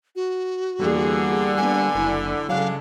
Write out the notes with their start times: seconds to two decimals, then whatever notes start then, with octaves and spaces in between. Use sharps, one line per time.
0.16 F#4
0.80 E2 D3 G3 A#3 G#4
1.57 A#3 B3 D4 G#5
1.95 F#1 E4
2.49 C#3 F#3 G#3 D4 A4 F5